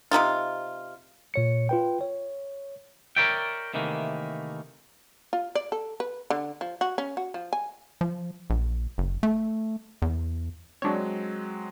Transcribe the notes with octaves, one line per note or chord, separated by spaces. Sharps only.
C3 F3 D#4 F4
A#2 C#5 C#7
F4 B4 G5
C#5
A#4 B4 C#5 D5 E5 G5
C3 D#3 E3 A3 A#3
F4
D5
A4
B4
D3
F3
F#4
C#4
F#4
F3
G#5
F3
A#1
F#1
A3
E2
F#3 G#3 C4 D4 C#5